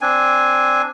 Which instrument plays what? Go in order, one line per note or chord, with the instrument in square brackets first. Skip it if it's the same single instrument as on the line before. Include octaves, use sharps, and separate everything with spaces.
[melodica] C4 D4 G#5